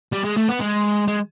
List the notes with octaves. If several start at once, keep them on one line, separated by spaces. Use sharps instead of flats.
G3
G#3
A3
B3
G#3
G#3